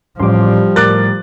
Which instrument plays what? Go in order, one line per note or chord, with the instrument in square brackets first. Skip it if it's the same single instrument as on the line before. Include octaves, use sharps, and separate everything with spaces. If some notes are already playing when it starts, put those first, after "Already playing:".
[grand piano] A1 [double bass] F3 [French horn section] G3 [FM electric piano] C6 D6
[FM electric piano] A2 A#4 [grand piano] D6 F#6 A6